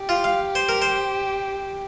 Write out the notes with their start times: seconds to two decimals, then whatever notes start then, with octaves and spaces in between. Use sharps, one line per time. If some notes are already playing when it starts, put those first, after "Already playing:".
Already playing: G4
0.09 F4
0.24 F5
0.55 C5
0.69 A#4
0.82 C5